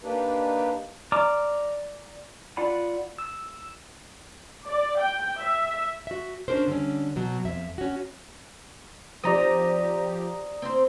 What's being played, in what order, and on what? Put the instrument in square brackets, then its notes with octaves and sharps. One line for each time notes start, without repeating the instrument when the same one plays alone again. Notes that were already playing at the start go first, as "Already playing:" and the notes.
[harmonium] A#3 D4 D#4 G4 B4
[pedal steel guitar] D5 A#5 D6 F6
F4 D5 F#5 B5
E6
[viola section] D5
G5
E5
[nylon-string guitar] F#4 E5
C#4 D4 G4 A#4 C5
D3 G3 C#4
B2 F#3
F2 E5
C#4 F#4
[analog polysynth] F3 G4 [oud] C4 D#4 [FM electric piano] D5 A#5 D#6
[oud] C4 C5